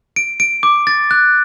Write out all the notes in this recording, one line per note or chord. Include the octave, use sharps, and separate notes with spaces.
D7
D7
D6
A6
F#6